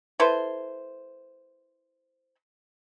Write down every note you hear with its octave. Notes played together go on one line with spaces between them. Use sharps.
E4 A4 B4 C5